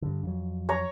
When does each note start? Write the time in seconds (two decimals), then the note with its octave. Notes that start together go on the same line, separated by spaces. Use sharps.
0.02 G2 D3
0.23 F2 F#3
0.69 C#5 A#5